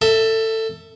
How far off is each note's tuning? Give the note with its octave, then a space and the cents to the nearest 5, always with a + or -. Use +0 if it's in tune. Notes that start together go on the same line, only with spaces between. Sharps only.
A4 +20 E5 -10